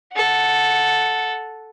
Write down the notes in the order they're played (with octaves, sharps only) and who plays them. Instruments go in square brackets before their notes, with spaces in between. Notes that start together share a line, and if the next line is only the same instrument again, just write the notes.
[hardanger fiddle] A4 F#5